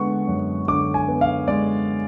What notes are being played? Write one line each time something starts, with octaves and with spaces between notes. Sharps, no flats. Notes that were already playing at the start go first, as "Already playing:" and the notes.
Already playing: D3 G#3 B3 F#5 C#6
F#2
D3 D6
G#5
B3
F5
G#3 D5